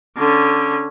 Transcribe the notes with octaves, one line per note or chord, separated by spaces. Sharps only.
D3 C#4